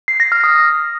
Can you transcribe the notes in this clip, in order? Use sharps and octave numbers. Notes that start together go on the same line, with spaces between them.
C7
A#6
F6
D#6